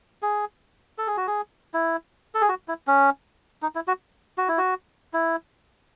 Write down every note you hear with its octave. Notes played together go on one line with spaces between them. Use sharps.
G#4
A4
G#4
F#4
G#4
E4
A4
G#4
F#4
E4
C#4
D#4
E4
F#4
F#4
E4
F#4
E4